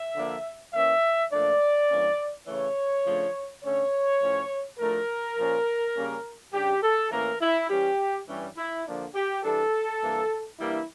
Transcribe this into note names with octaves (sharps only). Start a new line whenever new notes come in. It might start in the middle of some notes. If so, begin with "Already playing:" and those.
Already playing: E5
D3 F3 A#3 D4
E3 A#3 C#4 E5
A#2 F3 A3 D4 D5
G2 E3 A#3 C#4
C#3 E3 A3 C#5
C#3 F3 A3 D4
D3 A3 C#4 C#5
A2 F3 C#4
A2 F3 A3 D4 A#4
A#2 F3 C#4
C#3 G3 A#3 C#4
C#3 G3 D4 G4
A4
A2 E3 A#3 C#4 A#4
E4
E3 G3 C#4 G4
G2 E3 G3 C#4
E4
D3 F3 A#3 D4
G4
E3 G3 D4 A4
G2 E3 A#3
E3 G3 A#3 D4 E4